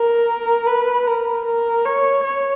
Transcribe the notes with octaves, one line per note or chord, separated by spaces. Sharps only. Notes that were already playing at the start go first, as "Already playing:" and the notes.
Already playing: A#4
B4
A#4
A#4
C#5
C#5